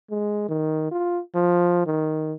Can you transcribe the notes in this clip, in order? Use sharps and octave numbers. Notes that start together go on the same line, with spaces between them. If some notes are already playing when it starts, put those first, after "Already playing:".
G#3
D#3
F4
F3
D#3